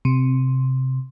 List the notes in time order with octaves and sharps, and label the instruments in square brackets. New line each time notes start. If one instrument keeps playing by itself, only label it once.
[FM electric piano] C3